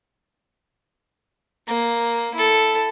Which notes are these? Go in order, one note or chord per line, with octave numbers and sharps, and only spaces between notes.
A#3
E4 A4